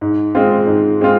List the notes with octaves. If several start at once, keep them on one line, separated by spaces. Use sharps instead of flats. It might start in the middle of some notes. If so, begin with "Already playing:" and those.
G#2
G#3 C4 F4
G#2
G#3 C4 F4